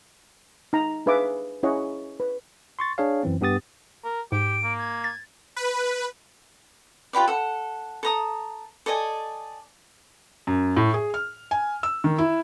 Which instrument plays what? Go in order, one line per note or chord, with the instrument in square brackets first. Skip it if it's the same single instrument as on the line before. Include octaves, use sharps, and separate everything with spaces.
[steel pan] D#4 A#5
D4 G#4 B4 E5 F5 D6
C#4 E4 G#4 C#5 D#5 F#5
B4
[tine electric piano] C6 C#6 A6
D4 G#4 C#5 F5
F#2 E3 C4
G2 B3 G4 D#6 A6
[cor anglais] A#4
[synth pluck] G#2 [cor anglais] G4 [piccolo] D7
[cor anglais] A#3
[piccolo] G#6
[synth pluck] A6
[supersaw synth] B4
[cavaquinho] F4 G4 B4 D5
A4 F#5
A4 A#5 D#6
A4 D5 D#5 G#5
[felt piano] F#2
A2
G#4
F6
G#5
E6
D#3
E4